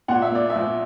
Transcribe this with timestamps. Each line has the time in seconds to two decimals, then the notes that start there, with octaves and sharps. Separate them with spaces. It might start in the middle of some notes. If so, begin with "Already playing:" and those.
0.08 A#2 F#5
0.22 E5
0.32 A#3 D5
0.50 E5
0.55 A#1